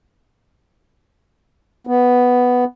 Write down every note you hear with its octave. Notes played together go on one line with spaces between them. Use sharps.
B3